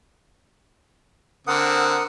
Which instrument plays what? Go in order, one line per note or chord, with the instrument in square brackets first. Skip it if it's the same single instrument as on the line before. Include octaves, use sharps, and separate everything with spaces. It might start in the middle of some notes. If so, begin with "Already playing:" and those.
[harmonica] D3 C4 [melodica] A#4 F#5 D#6